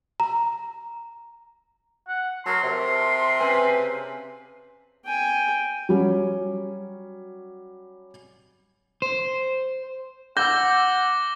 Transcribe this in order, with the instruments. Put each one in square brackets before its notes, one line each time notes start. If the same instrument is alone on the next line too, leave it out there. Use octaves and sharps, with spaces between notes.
[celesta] A#5
[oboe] F#5
[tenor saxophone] F#3 [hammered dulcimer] A4 A#4 [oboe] C6
[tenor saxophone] C3
[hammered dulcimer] C#3 C4 G#5 [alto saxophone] B4
[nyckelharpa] G5 G#5
[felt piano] F#3 G3 C#4
[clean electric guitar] C5
[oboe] F#5 [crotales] D6 A#6 G7 [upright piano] E6 G6